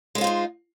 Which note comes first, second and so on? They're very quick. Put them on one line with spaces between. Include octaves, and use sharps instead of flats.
G#3 C5 F4 C4 D#4